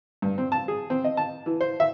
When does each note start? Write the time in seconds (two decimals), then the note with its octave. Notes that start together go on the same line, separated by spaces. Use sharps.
0.22 G2
0.38 C4
0.52 A5
0.68 G#4
0.90 C4
1.04 D#5
1.17 A5
1.46 E3
1.61 C5
1.80 E5